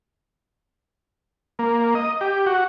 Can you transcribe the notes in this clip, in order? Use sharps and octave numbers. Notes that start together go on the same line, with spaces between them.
A#3
D#5
G4
F#4